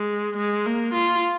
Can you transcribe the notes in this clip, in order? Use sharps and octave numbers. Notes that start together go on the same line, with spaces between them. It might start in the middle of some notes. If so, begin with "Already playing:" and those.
Already playing: G#3
G#3
A#3
F4